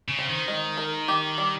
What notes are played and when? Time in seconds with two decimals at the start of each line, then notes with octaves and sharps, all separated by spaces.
0.08 C#3
0.19 C4
0.29 D#3
0.48 G#3
0.78 A#4
1.08 G4
1.38 G3